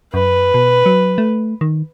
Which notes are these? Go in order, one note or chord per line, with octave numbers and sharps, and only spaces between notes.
F#2 B4
B2
F#3
A3
D#3